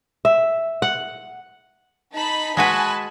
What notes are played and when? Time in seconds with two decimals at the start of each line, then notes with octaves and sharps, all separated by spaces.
0.25 E5
0.82 F#5
2.13 D#4 A5 B5
2.57 G#3 F#4 B4 G#5 A5 B5